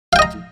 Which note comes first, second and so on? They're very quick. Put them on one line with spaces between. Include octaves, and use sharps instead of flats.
F5 G5 D#5 A#5